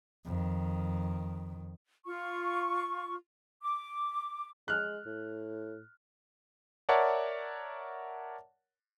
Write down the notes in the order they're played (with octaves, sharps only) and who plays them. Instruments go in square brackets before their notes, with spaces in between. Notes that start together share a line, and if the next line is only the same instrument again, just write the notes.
[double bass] F2 D#3
[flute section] F4 C#6
D6
[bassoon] G#3 [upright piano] F6 F#6
[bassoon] A2
[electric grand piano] A#4 C#5 D5 E5 F#5 A5